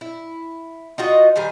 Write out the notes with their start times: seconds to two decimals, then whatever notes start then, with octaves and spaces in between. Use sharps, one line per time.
0.01 E4
0.98 D#4 F4 F#4 D#5
1.36 D#3 G3 C5 G#5